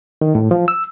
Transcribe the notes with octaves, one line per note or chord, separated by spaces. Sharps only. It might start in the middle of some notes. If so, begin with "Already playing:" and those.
D#3
A2
F3
E6